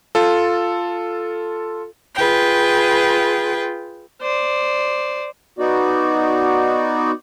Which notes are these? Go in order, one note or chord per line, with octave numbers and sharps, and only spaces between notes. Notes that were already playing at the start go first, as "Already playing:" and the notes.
F4 A4
F4 G#4 B4 G5
C5 D5
B3 D#4 F#4 D5